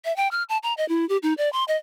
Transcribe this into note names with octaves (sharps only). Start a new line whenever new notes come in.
E5
G5
F6
A5
A#5
D#5
E4
G4
D#4
D5
C6
D#5